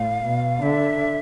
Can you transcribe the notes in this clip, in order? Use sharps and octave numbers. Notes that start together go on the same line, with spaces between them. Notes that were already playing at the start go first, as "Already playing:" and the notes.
Already playing: A2 F5
B2
D3 E5